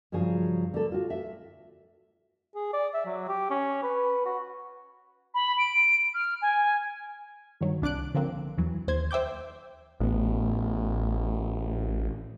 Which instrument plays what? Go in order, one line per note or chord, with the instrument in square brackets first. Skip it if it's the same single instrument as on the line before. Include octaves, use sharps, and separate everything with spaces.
[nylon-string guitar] G2 C#3 F3 F#3 G#4
D3 A4
F4 F#4
E5
[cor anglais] G#4
D5
E5
F#3
G4
C#4
B4
F#4
[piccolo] B5
D7
F6
G#5
[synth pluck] G2 D#3 F#3
C2 D4 D6 F#6 D7
D3 F3 A#3 C4
E2 E3 F#3
D#2 C5 G#6
C5 E5 G5 D6 G6
[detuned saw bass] A1 [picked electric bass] A2 B3